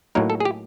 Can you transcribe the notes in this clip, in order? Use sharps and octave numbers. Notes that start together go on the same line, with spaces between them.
A2 F#3 A#3 D#4 A#4
A4
G#4
G4